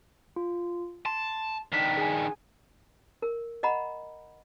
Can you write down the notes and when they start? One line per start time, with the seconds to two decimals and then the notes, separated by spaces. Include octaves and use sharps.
0.36 F4
1.06 A5 C6
1.72 D#3 D4 G5 B6
1.97 G#4 G#5
3.22 A#4
3.63 D#5 F#5 A#5 B5